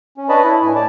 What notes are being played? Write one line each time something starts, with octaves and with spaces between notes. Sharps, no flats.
C#4
D4 B4 C#5 D#5 A5 B5
E4
A2 G#5
A3 D5 A5